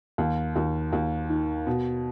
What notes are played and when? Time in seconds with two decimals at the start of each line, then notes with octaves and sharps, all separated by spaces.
0.18 D#2
0.56 D#2
0.93 D#2
1.29 D#3
1.67 B2